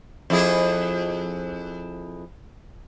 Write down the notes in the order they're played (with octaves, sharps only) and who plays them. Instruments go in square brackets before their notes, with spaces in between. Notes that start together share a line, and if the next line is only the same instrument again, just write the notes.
[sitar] F2 E4 G#4